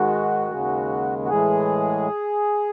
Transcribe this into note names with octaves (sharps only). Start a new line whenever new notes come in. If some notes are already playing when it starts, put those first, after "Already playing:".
Already playing: G#2 D#3 G#3 F#4
D#2 C#3 G#3
F#4
A2 E3 G#3 G#4